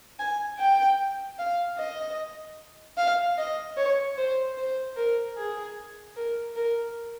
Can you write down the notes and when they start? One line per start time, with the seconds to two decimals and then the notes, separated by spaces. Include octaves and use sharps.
0.19 G#5
0.59 G5
1.39 F5
1.78 D#5
2.97 F5
3.38 D#5
3.77 C#5
4.17 C5
4.58 C5
4.97 A#4
5.37 G#4
6.16 A#4
6.56 A#4